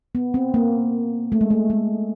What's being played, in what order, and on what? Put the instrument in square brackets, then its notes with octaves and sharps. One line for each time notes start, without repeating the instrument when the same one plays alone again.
[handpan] B3
C4
A#3
A3
G#3
A3
G#3